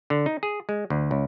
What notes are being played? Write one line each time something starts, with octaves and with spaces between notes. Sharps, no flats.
D3
D#4
G#4
G#3
D2
C#2